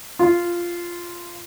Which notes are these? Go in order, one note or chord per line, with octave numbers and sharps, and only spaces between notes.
F4